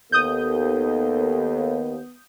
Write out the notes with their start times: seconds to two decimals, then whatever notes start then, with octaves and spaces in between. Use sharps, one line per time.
0.12 D#2 B3 A4 D#6 G6